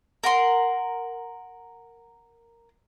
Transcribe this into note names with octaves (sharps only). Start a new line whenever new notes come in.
A#4 F#5 C6